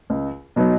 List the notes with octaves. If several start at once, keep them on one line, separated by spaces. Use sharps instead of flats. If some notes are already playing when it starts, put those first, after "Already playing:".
C#2
B2 F#3 B3 D#4